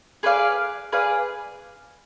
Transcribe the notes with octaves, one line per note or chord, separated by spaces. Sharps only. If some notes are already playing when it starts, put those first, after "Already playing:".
G#4 B4 D5 F5
G#4 B4 D5 F5